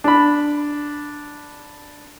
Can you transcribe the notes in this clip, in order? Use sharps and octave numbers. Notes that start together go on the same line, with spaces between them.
D4 B5